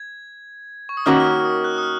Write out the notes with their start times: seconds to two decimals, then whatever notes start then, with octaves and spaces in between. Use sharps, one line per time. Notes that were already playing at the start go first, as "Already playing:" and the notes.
Already playing: G#6
0.89 C#6
0.97 D#6
1.06 D#3 A#3 C#4 F#4 F6
1.20 F6
1.25 D#6
1.45 D#6
1.64 F#6
1.78 D#6
1.83 F6